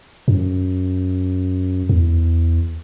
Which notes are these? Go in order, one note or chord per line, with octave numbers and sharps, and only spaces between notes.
F#2
E2